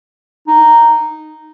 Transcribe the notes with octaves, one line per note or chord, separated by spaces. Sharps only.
D#4